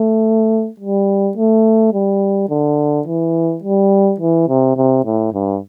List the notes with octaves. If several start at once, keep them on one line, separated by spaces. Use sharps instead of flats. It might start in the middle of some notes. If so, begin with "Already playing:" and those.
Already playing: A3
G3
A3
G3
D3
E3
G3
E3
C3
C3
A2
G2